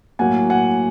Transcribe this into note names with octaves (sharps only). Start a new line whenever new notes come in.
A2 F#3 A#3 F#5 G#5
F#5 G#5